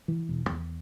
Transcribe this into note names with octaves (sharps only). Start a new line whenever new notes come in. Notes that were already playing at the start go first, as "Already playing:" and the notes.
E3
E1
E2